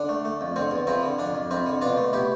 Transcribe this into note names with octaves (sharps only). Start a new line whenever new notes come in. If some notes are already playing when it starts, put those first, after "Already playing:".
Already playing: D3 D4
A3
A3
F2
D3 C4
E2
F3 C4 E4
D3
F2 D4
F2
F2 C4 E4
D3
B2 D4 F4
A3
B2 E4 G4